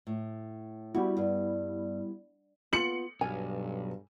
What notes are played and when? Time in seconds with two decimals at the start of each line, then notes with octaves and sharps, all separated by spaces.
0.07 A2
0.94 G3 B3 E4 F#4
1.17 G2
2.73 B3 F4 C#7 F#7
3.21 B1 G2 G#5